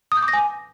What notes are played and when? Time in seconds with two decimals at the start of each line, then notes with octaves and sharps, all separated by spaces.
0.12 D#6
0.17 G6
0.23 D6
0.28 A#6
0.33 G#5